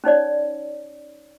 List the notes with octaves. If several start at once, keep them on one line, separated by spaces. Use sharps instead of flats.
C#4 D#4 C#5 D5